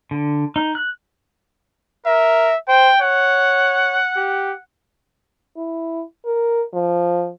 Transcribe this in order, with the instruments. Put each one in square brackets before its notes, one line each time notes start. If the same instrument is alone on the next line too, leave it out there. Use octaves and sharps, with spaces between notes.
[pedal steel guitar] D3
D#4
F#6
[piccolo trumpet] A#4 [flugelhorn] E5
[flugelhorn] C5 [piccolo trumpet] G5
[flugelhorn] C#5 [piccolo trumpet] F#5
[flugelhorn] G4
[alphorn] E4
A#4
F3